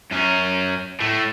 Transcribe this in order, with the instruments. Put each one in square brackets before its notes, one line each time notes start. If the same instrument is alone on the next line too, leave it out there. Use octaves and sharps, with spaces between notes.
[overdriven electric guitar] F#2 C#4
A2 A3